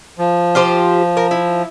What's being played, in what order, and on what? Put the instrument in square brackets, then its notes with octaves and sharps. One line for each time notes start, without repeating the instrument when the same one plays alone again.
[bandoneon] F3
[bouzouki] F4 G4 C5
A#4
E4